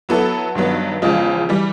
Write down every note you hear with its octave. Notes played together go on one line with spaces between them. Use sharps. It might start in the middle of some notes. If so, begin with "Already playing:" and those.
F#3 B3 E4 A4
G2 D#3 F#3 B3
E2 C#3 F3 G#3
E3 G3